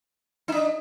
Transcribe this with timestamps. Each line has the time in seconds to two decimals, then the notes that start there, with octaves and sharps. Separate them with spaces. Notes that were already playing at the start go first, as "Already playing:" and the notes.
0.48 D#4
0.52 D4